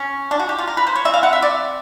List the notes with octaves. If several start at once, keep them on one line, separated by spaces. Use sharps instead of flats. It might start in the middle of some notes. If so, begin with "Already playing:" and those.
Already playing: C#4
D4
F#4
G4
F4
A#4
B4
C5
C#5
E3 G3 C4 E5
F5
F#5
E5
D5